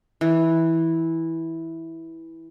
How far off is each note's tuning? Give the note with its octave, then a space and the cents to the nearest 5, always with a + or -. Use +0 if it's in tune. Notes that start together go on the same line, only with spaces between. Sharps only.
E3 -10